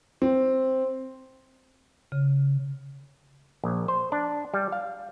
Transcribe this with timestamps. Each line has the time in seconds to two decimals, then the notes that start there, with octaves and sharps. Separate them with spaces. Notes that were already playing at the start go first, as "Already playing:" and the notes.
0.22 C4
2.12 C#3
3.64 A#1
3.88 C5
4.12 D4
4.54 G3
4.72 F5